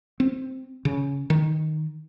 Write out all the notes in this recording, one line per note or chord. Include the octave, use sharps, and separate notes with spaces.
C4
C#3
D#3